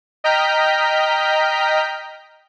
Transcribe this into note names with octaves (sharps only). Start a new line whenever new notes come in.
D#5 G5 A#5 F6 G6 B6